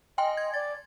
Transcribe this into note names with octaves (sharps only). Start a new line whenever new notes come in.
D#5 G5 G#5 C6
G#6
D5 A6